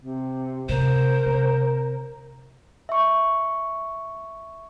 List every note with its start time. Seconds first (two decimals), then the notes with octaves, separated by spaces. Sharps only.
0.02 C3
0.69 C3 A#4 C5
1.26 C3
2.89 E5 C#6